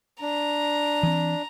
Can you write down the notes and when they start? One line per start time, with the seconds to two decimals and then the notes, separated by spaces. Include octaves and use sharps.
0.21 D4 A#5
1.03 E3 C4